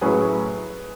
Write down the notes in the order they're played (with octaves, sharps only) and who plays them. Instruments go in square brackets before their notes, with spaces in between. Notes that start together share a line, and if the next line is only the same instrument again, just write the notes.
[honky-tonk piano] A2 F#3 C#4 E4 [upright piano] G#4 B4